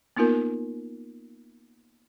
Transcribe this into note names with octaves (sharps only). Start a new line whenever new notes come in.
A#3 B3 D#4 F4 A#4